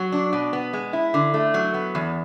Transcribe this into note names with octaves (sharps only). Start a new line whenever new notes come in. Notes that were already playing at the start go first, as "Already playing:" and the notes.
Already playing: F#3
D4
B2
B3
G#3
E4
D3
A3
F#3
B3
E2